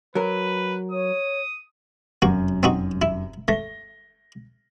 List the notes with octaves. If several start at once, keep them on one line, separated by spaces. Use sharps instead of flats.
F#3 A#4 B4
C#5 D#6
F1 F#2 A#3 F#4
C4 D#4 F#4
E4
A3 A#6 G7